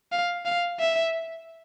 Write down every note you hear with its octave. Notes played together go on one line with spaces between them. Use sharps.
F5
F5
E5